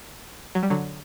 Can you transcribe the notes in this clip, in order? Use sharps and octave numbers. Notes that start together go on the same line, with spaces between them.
F#3
G3
D3 F#3